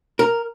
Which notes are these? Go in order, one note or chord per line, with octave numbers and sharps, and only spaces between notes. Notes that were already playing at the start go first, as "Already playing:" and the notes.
A#4